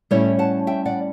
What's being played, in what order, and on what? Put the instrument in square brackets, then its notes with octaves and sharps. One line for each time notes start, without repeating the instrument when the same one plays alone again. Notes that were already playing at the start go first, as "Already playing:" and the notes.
[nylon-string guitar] A2 G3 C#4 E4 A4 C#5
F#5 A5
E5 G5
D5 F#5